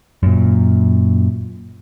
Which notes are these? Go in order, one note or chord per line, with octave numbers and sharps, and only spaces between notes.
F#2 A#2